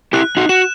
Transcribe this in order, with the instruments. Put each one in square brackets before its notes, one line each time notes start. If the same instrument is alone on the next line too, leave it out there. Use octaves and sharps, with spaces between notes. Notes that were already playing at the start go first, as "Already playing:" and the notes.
[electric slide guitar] E4 G4 [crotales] F#6
[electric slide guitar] D#4 F#4
[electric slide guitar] F#4 [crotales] E7